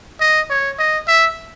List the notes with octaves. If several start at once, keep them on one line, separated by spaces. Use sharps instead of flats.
D#5
C#5
D#5
E5